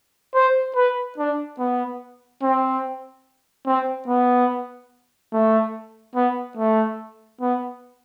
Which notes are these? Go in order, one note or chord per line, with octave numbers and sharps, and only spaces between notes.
C5
B4
D4
B3
C4
C4
B3
A3
B3
A3
B3